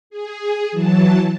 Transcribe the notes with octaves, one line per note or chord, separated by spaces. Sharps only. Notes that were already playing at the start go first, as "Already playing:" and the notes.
G#4
E3 F#3 A5